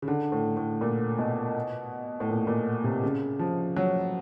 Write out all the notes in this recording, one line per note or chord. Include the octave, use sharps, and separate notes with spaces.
C#3
D3
A2
A2
A#2
B2
A2
A#2
A#2
C3
C#3
F3
F#3